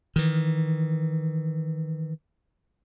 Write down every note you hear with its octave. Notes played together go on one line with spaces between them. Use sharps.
D#3 E3